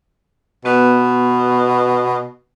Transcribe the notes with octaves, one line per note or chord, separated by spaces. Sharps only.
B2 B3 F#4 B4